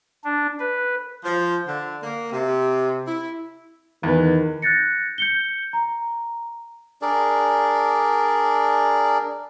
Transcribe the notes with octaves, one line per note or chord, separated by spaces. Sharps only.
D4
B4
F3
D3
A#3
C3
E4
E2 D#3 B4
F#6 G6 A6 A#6 C#7
G6 C#7 G7
A#5
D4 G#4 A#4 D5